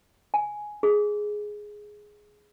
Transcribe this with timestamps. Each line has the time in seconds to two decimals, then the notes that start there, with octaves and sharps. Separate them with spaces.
0.34 G#5
0.83 G#4